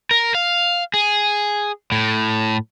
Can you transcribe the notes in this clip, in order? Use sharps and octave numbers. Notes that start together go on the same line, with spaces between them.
A#4
F5
G#4
A2